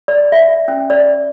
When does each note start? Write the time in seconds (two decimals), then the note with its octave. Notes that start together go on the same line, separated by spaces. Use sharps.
0.08 D5
0.32 E5
0.68 C#4
0.90 D5